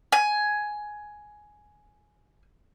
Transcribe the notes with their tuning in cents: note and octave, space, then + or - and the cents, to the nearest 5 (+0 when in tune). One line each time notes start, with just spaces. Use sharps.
G#5 +10